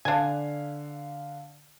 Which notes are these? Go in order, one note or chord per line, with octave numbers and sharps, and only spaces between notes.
D3 D4 F5 G#5